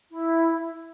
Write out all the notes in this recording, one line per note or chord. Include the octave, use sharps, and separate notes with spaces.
E4